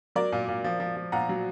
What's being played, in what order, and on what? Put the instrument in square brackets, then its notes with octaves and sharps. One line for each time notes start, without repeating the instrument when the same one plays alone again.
[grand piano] F#3 A#4 D5
A#2
A#2
F3
F3
F3
A#2 F#5 A#5
F#3